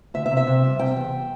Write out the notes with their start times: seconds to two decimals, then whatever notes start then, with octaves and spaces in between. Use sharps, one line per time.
0.14 D2 E5
0.26 E5
0.31 C3
0.37 E5
0.47 C3
0.64 G3
0.79 C3 G5
0.96 E2